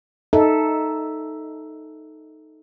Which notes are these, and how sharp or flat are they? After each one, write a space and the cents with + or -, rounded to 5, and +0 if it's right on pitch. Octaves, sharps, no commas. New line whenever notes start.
D#4 +0 A4 +0 E5 -10